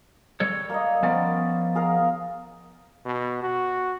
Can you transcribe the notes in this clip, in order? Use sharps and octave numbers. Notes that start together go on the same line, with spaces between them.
G3 A4 C#5
A#3 D5 D#5
F3 B3 C#4 A#4 C5 D5
G#4 A#4 F5
B2
F#4